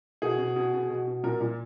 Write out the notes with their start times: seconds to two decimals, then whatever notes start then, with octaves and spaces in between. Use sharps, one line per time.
0.22 B2 G#4
0.38 B2
0.56 B2
0.73 B2
0.90 B2
1.07 B2
1.23 A#2 A#4
1.40 A#2